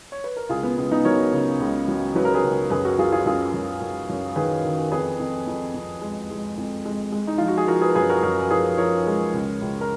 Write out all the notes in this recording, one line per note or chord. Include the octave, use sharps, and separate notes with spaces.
C#5
B4
A#4
C#2 F4 G#4
B3
C#2 B3
B3 D#4
F#3 A#4 C#5
C#3
C#2
F#3
F#3 B4
A#4
G#4 B4
C#2
F#2 G#4 B4
F#4 A#4
F#3 F4 G#4
F4 G#4
F#2 F4 G#4
F#2
F#2
F#2
D#3 G#4 B4
D#3
F2 G#4 B4
F2
F2
F2
G#3
G#3
F2
G#3
G#3
D#4
F3 F4
F#4
G#4
F3 F#4 A#4
G#4 B4
A#4
F#2 G#4 B4
F#4 A#4
F#2 F#4 A#4
A#4
F3 G#4 B4
F3 A#4 C#5
G#3
C#2
C#2
A#4